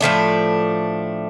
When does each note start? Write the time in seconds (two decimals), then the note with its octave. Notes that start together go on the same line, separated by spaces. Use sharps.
0.01 A2 F3 A3 D4